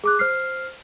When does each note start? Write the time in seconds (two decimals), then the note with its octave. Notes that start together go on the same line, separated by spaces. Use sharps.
0.04 G#4 D6 F#6
0.19 C5 F6 C7